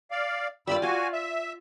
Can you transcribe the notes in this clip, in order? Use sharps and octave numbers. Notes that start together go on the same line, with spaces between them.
D5 F5
G2 G3 F4 D5 B5 E6
F4 F#4 F5 G#5
E5